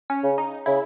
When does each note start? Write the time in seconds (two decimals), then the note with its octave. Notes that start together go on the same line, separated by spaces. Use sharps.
0.10 C#4
0.24 C#3
0.38 D#4
0.66 C#3 E4